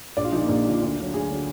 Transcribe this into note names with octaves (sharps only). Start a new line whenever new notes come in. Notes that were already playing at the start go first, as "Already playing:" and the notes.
A#1 D5
F4
A#2 F3 A#3 D#4
A#1 A#3
A#2 F3
D2
D3 F#3
D2 G#4
D3 F#3